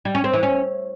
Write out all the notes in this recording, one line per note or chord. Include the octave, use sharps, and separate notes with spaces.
G3
C#4
C4
E3
C#4